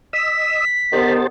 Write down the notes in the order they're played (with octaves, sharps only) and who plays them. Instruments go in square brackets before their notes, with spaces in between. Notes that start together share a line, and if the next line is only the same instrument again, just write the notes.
[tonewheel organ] D#5 E6 [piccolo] B6
[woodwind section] D3 D#3 B3 [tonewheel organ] G4 C5 A5